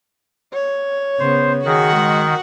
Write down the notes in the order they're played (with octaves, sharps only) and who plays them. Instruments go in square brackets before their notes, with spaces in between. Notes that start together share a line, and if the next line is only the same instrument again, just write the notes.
[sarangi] C#5
[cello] C#3 [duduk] B3 [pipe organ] C5
[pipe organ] D#3 [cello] F#4 F#5 [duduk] G#4
[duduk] G#3